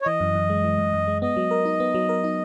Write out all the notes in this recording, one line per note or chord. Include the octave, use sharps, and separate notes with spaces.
C#5
E3 D#5
F#2
F#2
G#3
E3
F#2
F#2
G#3
B3 D#5
F#3
A#4
D#4
B3
F#3
A#4
D#4